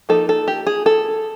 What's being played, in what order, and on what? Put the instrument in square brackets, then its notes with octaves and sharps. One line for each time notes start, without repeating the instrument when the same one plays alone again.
[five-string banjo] F3 A#3 D#4 A4
A4
G4
G#4
A4